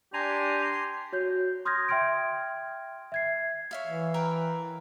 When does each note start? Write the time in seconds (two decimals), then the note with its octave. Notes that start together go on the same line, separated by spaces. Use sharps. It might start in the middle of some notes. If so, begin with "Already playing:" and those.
0.14 D4 G4 G#5 A#5 C6
1.12 F#4 C#5 G6
1.65 C6 D#6 F6 G6 G#6 A#6
1.89 E5 G5 C6 F6 G#6 D7
3.12 E5 G#6 C7
3.71 C#5 E5 F5
3.84 E3
4.14 A#4 B4 G5